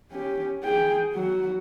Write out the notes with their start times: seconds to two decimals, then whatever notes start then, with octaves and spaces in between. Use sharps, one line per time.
0.12 C#4 G4
0.64 G#4 G5
1.13 F#3 F#4